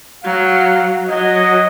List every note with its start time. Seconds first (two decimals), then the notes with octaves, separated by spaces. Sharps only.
0.24 F#3 F5
1.08 F#3 D#5